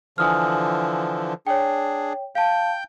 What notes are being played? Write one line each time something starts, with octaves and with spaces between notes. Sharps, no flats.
D3 E3 F3 G#5 D#6 F6
D4 G#4 C#5 G5
F5 G5 A5 G6